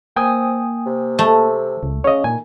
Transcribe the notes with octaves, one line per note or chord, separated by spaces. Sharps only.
A#3 C4 G5 G#5 D#6
C3
A3
C#2
C#3 C#4 C#5 D#5
A#2 D#3 G#5